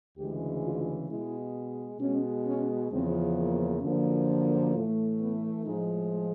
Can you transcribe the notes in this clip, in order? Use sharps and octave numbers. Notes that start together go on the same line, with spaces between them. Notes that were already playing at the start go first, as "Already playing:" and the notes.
D2 C#3 E3 G#3 G4
F4
B2 G#3 E4
B2 G#3 C#4
C#4
E2 C#3 F3 C4
A#3
F#2 D3 F3 A#3
A2 E3 A3
B3
A2 F3 G#3 D#4